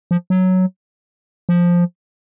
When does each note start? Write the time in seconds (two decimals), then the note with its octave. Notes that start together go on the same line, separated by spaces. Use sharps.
0.11 F3
0.30 F#3
1.49 F3